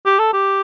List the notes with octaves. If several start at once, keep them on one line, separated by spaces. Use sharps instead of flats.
G4
A4
G4